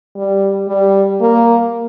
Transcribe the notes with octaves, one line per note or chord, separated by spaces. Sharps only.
G3
G3
A#3